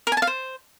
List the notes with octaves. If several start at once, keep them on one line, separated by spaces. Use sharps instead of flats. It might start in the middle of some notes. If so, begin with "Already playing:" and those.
A#4
G#5
A5
F5
C5